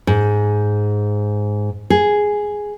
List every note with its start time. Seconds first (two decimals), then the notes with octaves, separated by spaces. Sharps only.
0.07 G#2
1.90 G#4